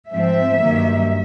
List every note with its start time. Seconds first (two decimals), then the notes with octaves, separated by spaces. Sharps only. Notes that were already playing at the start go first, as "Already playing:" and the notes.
0.12 G#2 F3 A3 C4 E5
0.61 G2 D#3 F#3 A#3